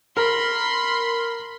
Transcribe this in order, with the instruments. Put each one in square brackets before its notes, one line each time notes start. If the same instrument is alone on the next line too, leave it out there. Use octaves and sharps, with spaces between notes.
[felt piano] A#4 [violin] B5 C6